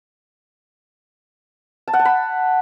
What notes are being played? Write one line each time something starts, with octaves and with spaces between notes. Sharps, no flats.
A5
F#5
A5
B5